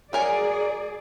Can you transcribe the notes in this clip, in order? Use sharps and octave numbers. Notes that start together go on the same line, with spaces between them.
F#3 G#4 A#4 D5 G#5